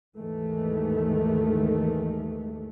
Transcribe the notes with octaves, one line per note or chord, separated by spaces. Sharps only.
D#2 G#2 D#3 E3 G#3 A3